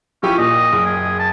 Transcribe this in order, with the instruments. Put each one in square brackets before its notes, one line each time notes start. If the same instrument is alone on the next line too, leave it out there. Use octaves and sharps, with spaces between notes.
[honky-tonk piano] F3 E4 G4 [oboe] C#4
[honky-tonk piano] A#2 [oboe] D#5
[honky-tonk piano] F#1
[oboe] G#4
A5